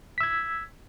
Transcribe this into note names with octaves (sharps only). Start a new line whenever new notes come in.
E6 G#6 B6